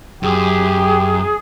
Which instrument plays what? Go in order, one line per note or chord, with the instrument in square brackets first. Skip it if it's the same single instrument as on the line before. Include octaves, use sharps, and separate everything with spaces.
[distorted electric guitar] F#2 [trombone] G4 [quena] G#4